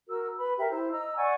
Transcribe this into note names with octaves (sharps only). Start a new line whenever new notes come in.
F#4 A#4 E6
B4 B5
G4 A#4 E5
E4 C5
D#5 A#5 E6
D5 F#5 G#5 C#6